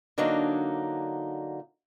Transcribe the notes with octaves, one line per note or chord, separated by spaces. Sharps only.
D3 F#3 A#3 D4 D#4